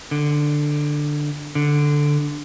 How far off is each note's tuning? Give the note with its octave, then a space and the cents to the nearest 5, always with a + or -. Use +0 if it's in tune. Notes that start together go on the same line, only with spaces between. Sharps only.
D3 +10
D3 +0